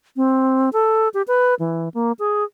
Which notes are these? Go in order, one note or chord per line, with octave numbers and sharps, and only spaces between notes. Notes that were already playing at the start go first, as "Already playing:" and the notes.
C4
A4
G4
B4
E3
A#3
G#4